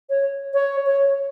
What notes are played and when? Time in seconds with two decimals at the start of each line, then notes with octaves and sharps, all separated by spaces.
0.10 C#5
0.53 C#5
0.86 C#5